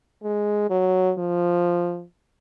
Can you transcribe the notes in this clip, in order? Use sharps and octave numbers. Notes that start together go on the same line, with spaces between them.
G#3
F#3
F3